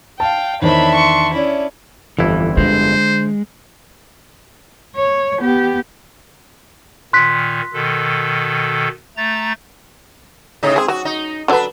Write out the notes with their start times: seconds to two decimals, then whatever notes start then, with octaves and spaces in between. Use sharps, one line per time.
0.20 F5 G5 A5
0.62 E2 D#3 D4 C5 C#5 E5 B5
0.95 C6 C#6
1.34 C#4 E4 D5
2.19 G1 F2 E3 E4
2.57 D3 G#3 C5
4.95 C#5
5.39 B3 G4
7.13 A#2 D#3 C6 F#6 B6
7.73 B2 D#3 A4
9.17 A3 A#5 A6
10.63 A2 C#3 D#4
10.76 G#3 C4 G#4
10.88 F#3 F#4
11.05 D#4
11.48 D3 F#3 D4 A4 B4